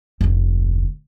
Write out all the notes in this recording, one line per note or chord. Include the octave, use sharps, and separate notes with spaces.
F1 D2